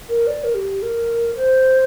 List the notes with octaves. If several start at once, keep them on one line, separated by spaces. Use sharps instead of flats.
A#4
D5
A#4
G4
A#4
C5